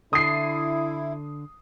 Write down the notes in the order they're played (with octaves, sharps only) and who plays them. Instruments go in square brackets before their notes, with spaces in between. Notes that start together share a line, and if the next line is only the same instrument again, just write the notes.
[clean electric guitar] D3 [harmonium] E4 [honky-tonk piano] D#6 C7